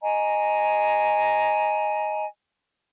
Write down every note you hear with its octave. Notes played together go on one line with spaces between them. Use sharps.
D#5 G#5 A#5